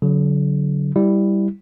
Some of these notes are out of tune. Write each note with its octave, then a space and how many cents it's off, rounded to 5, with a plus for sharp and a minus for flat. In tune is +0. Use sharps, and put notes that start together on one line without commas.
D3 -40 F#3 +0
G3 +5 E4 +0